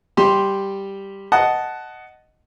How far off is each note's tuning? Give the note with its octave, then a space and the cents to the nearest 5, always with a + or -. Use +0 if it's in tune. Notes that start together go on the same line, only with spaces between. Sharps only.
G3 +0 G4 +0 C6 +0
D#5 +0 F#5 +10 A5 -10